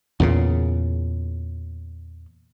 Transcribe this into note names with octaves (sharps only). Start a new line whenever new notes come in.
E2 A#2 C#3